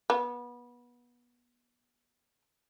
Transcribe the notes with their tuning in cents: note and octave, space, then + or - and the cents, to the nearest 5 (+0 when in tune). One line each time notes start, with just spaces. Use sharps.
B3 -25